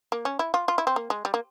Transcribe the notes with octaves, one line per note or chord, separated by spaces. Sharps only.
A#3
C#4
E4
F4
F4
E4
C4
A#3
G#3
G3
A#3